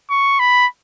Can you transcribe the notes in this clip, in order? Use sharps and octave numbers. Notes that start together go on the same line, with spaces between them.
C#6
B5